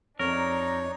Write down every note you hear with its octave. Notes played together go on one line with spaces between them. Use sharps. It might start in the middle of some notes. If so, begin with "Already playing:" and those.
F2 D4 D#4 A#4 C#5